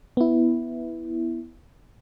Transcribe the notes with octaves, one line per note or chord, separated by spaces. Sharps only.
B3 E4